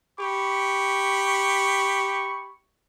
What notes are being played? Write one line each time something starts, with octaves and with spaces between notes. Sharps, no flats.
G4 B5 C#6